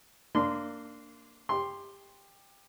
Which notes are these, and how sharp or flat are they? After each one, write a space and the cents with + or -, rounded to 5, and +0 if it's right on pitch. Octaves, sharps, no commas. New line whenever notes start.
A#3 -15 D4 +0 C6 -20
G4 +20 C6 +0